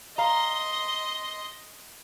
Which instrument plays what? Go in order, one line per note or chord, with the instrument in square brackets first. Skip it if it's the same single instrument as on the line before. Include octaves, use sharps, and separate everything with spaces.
[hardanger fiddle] D#5 C6 [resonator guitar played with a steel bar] F5 A#5